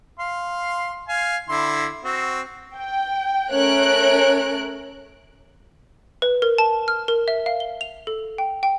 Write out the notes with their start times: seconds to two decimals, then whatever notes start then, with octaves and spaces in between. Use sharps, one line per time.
0.19 F5 C6
1.08 F5 G#5
1.49 D3 E4 C6
2.04 C4 F#4
2.75 G5
3.51 A3 C#4 A#4 C#5 F#6 D7
6.22 B4
6.42 A#4
6.58 A5
6.88 F6
7.08 A#4
7.28 E5
7.46 F5
7.60 G7
7.81 F7
8.07 A4
8.38 G5
8.63 G5